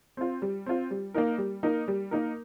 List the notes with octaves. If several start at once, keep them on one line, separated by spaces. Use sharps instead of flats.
C4 F4
G3
C4 F4
G3
A#3 D#4 A#4
G3
A#3 D#4 A#4
G3
A#3 D#4 A#4